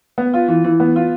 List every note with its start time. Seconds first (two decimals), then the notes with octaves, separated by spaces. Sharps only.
0.18 B3
0.34 F4
0.48 E3
0.64 E3
0.80 B3
0.96 F4